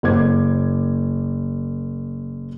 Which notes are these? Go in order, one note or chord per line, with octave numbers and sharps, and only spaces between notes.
F#1 A#3 C5 D6 G#6